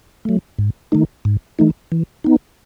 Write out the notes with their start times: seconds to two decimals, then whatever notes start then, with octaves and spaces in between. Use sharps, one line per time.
0.25 F#3 A3
0.59 G#2
0.92 D#3 A3 D#4
1.25 G#2
1.59 E3 A3 D#4
1.92 E3
2.24 B3 D#4